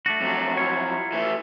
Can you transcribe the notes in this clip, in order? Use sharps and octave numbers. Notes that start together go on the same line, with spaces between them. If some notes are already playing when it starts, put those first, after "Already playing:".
A3 D4 F#4
F2 F#3
E4 F4 C#5
E3 A3